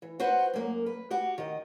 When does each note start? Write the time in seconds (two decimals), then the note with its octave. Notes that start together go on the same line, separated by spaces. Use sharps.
0.02 E3
0.20 F#4 B4 C5 F#5
0.53 F#2 A#3 A#4
0.86 B4
1.11 F#4 G4
1.38 D#3 D#5